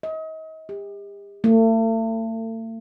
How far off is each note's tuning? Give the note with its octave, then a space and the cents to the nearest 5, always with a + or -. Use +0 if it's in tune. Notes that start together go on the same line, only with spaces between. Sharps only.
D#5 +35
G4 +40
A3 +40